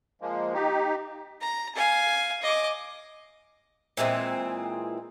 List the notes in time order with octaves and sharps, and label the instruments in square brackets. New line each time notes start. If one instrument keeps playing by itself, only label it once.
[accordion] F3 G#3 A#3
D#4 G4
[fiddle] A#5
F5 G#5
D#5 D6
[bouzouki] A#2 E3 G#3 C4